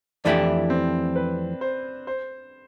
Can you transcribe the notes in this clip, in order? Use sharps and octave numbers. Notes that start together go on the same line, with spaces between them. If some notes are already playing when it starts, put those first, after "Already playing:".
F2 E3 A3 D4 E4 G4
C4
B4
C5
C5